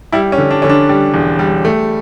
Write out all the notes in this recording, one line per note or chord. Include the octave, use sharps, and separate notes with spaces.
G3 E4
C#4
D3
D4
D3 C#4
D4
G3
E1
G3
A3